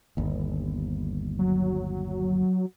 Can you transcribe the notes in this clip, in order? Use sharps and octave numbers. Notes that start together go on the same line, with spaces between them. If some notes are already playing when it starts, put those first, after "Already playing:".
G1 D#2
F#3